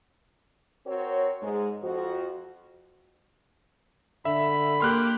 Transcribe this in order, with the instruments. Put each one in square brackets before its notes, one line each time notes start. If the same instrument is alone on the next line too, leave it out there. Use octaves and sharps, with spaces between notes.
[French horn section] C4 F#4 A#4 C#5
G#2 G#3
F2 F3 F#4
[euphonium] D3 [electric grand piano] E5 [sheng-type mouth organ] B5
[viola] A#3 G4 [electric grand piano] C6 F6 F#6